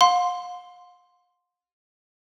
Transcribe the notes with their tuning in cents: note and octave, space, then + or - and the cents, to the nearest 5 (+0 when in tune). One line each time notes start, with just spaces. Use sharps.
F5 +40 C6 +0